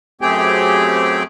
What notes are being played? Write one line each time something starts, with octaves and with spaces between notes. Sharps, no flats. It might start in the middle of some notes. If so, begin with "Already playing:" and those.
F#2 A3 C4 G4 G#4 G5